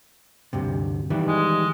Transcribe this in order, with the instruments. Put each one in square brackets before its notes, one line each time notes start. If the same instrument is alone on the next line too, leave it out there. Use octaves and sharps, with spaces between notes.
[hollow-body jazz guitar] D2 G2 C3
D#3 E3 G3
[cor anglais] G#3